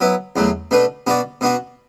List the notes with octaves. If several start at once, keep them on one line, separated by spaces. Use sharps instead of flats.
F#3 B3 E4
E2 B2 F#3 A3
B2 A3 D4 B4
B2 B3 D4 F#4 D5
B2 B3 D4 F#4